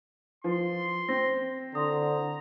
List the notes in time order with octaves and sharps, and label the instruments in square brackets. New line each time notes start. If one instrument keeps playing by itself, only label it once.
[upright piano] F3 [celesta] B4 [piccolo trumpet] C6
[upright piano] C4 [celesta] A#6
[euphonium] D3 [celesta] E4 C6 D#6 [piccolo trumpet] A#5